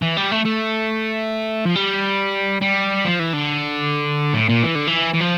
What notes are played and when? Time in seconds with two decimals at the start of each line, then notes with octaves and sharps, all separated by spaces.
0.02 E3
0.17 G3
0.32 A3
0.45 A3
1.66 F3
1.75 G3
2.61 G3
3.05 F3
3.19 E3
3.33 D3
4.34 A2
4.49 A#2
4.63 E3
4.75 D3
4.87 E3
5.14 E3
5.21 F3